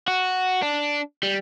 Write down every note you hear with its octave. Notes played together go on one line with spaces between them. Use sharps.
F#4
D4
G3